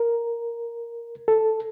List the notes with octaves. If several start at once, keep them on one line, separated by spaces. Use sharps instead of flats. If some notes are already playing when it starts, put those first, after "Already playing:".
Already playing: A#4
A4